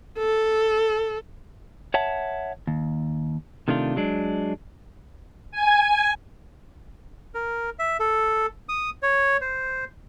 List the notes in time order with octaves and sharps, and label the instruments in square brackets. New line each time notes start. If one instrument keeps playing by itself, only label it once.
[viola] A4
[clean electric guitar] C#5 E5 F#5 A5
D#2
C3 D#3 A3 D4 F4
F#3 G#3 D4
[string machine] G#5
[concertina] A#4
E5
A4
D#6
C#5
C5